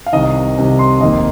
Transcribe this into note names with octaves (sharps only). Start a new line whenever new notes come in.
F5
C2 C3 D#3 D#5
C2 C3 D#3
C6
F1 D#2 D#3 A#3 D#5